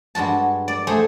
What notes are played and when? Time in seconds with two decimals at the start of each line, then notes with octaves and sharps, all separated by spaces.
0.15 G2 G#3 F#4 A5
0.68 D5
0.87 A3 G#4 C5